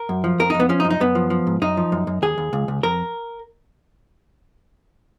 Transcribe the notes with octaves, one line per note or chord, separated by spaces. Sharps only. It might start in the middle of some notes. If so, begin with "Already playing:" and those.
Already playing: A#4
F#2
F3
F2 A#4
D#4
F2
B3
F3 C#4
D#4
F#2
D#4
F#2 B3
F3
F3
G#2
F#2 D#4
F3
F#2
F#2
D#2 G#4
D#2
C#2
C#2
F2 A#4